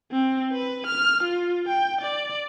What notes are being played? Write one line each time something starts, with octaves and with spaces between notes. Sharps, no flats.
C4
B4
F6
F4
G5
D5